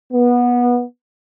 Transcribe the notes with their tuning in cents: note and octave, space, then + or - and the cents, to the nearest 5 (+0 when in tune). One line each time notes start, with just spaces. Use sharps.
B3 -20